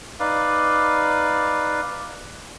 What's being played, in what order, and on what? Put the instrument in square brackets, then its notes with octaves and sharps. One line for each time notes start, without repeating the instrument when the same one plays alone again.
[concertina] D#4 B4 D5 F5